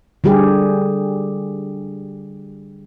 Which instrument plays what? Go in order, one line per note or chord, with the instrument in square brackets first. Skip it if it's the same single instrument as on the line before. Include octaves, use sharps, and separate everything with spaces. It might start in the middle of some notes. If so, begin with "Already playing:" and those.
[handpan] D3 G3 G4 G#4